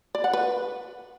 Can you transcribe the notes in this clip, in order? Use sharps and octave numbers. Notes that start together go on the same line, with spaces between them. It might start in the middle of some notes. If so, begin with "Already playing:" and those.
D5
F#5
B4